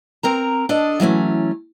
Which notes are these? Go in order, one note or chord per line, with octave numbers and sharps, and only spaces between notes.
C4 A#4 A#5
D4 A4 D5 D#5
E3 F#3 A3 C#4